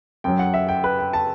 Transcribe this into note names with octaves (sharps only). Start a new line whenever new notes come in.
F#2 F#3 G5
F#5
E5
G5
B4
G5
A5